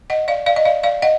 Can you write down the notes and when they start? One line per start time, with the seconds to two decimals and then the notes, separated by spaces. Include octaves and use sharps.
0.10 D#5 F#5
0.28 D5 F5
0.46 D5 F5
0.56 D#5
0.65 D5 F5
0.83 D5 F5
1.02 D#5 F#5